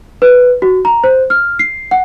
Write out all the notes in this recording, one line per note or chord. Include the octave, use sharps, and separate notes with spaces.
B4
F#4
A#5
C5
F6
C7
F#5